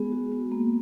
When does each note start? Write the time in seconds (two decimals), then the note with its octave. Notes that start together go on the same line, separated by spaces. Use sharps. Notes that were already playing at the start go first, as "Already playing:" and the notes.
Already playing: G#3 B3 G#4
0.12 F#4
0.32 B3
0.52 A#3